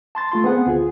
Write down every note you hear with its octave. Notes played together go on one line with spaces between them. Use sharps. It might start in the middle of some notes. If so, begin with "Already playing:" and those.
A5 C6 A6
A3 F4 C6
B3 C4 G#4 C5 F#5
D2 F4 G#4